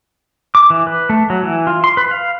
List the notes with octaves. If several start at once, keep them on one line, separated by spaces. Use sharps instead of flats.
D6
E3
B4
A3
F#3
E3
F4
C6
B4
F5